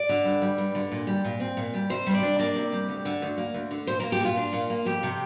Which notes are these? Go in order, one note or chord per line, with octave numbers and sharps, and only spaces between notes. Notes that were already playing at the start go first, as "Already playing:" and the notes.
Already playing: D5
D3
G2
G3
G2
D3
A#2
G3
A#2
C4
A#2
G3
C3 C5
G3 C5
D5
D4
A#3 D5
C3
G3
D2
D3
D2
A#3
D2
D3
A#2 C5
A#3 A#4
G4
A#2 F4
D4
A#2
A#3
F2 G4
C3